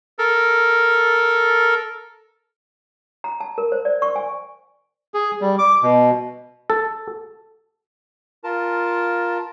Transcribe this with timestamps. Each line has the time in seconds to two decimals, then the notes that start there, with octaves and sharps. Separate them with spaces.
0.19 A4 A#4
3.24 A#5
3.40 A5
3.58 A#4
3.72 C5
3.85 D5
4.02 C#6
4.16 G#5
5.14 G#4
5.41 G3
5.59 D6
5.82 B2
6.70 A4
8.44 F4 A#4 A5